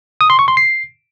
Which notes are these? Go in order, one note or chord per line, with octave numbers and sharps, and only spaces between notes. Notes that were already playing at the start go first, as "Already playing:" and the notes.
D#6
C6
C#6
C6
C7